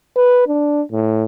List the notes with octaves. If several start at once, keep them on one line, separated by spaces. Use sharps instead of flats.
B4
D4
A2